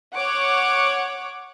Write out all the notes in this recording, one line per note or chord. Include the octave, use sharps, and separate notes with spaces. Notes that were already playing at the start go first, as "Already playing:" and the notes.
C#5 F#5 D6